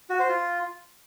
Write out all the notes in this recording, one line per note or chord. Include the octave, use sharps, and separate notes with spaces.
F#4
C5
F4